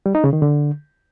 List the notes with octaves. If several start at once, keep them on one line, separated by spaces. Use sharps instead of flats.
G3
D#4
C#3
D#3
D3